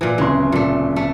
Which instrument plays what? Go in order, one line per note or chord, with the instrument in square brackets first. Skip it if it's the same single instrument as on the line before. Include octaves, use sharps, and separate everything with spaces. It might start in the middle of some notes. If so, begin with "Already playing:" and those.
[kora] A#2 E3
[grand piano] D1 C#3 C6 [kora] G#3
[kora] A#2 A3
A3